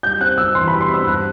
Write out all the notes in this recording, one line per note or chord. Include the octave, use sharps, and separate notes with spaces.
G3 G6
C4 F#6
G2 E6
E3 C6
G3 B5
C6
C4 E6
G2 F#6